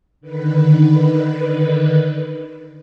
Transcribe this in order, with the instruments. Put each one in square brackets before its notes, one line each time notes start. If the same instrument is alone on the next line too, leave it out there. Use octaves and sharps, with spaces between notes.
[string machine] D3 D#3 B4